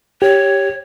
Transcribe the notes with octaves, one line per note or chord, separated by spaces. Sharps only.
G4 C#5